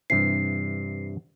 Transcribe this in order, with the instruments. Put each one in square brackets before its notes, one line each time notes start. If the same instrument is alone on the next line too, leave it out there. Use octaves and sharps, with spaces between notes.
[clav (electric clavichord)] G2 C3 E3 [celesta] C7